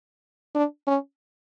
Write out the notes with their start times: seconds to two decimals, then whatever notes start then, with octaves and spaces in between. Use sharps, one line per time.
0.55 D4
0.87 C#4